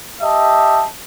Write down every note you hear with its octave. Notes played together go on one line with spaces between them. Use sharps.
G4 D#5 E5 A5